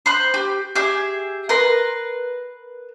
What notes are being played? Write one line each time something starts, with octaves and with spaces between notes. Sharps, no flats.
C5 B5 F#6
G4
G4 G#4 E5
A#4 B4 C6